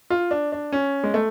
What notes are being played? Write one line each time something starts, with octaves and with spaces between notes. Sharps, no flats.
F4
D4
D4
C#4
G#3
A3